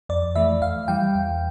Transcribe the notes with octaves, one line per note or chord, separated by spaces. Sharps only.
F2 D5
E3 A3 E5
F2 F5
E3 G3 G5
E2